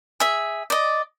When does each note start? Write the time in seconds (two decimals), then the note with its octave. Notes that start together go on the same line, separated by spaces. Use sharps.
0.20 G#4 E5
0.70 D5 D#5